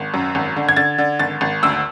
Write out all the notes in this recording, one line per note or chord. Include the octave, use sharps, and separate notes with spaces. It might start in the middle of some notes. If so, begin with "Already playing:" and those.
Already playing: G#1
F#2
G#1
D3
G#6
D3 A6
D3
G#1 A6
G#1
D2 E6